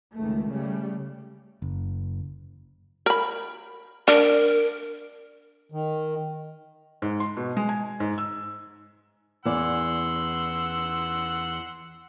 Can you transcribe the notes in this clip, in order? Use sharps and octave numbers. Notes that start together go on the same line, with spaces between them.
C#2 D#3 A3
C#3 G3 A3
F#1
A#4 B5
D4 A#4
D#3
G#2
C6
B2
G#3
G#5
G#2
E6
E2 D5 F#5 C6 E6